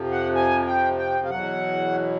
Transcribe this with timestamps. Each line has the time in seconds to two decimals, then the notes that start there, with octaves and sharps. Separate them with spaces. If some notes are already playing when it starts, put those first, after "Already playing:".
Already playing: F2 C3 F3
0.11 F#5
0.35 G#5
0.67 G5
0.98 G5
1.25 F5
1.30 E2 B2 F#3 F#5